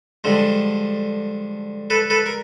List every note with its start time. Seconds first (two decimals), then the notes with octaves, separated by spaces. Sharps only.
0.24 G2 D3 F3 G#3
1.90 A4 B4
2.10 A4 B4
2.26 A#4